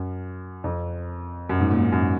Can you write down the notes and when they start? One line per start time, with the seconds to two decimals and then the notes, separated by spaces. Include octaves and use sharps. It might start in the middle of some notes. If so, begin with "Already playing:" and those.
Already playing: F#2
0.64 F2
1.49 F#2
1.60 G#2
1.71 A#2
1.81 G#2
1.92 F#2